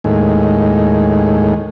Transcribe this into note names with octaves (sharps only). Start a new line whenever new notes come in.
D#2 A2 G#3